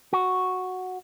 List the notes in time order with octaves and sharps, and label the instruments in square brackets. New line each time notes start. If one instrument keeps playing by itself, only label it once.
[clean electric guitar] F#4